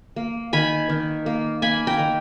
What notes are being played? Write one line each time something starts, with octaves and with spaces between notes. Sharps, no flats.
A#3
D#3 G#5 B5
D#3
A#3
A#3 G#5 B5
G5 A#5
D#3